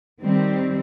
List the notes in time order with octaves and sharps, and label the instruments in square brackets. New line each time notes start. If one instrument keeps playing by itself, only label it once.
[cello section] D#3 G3 C4